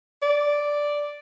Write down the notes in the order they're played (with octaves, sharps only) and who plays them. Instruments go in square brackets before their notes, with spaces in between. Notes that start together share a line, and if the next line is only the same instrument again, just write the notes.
[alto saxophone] D5